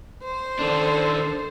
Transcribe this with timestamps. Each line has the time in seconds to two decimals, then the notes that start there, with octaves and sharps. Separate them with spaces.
0.24 C5
0.59 D#3 D4 A4